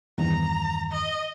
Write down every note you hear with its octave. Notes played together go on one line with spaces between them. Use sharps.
E2 G2 D#3 A#5
D#5